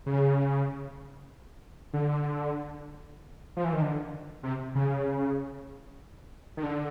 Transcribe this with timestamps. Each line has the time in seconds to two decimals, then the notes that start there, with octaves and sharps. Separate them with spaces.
0.06 C#3
1.93 D3
3.57 F3
3.65 E3
3.73 D#3
3.82 D3
4.43 C3
4.75 C#3
6.57 D#3
6.63 D3